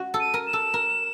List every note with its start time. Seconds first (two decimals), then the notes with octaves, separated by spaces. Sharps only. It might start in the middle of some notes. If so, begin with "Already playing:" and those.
Already playing: F#4
0.14 A4
0.20 D#7
0.34 A#4
0.47 E7
0.53 A4
0.74 A#4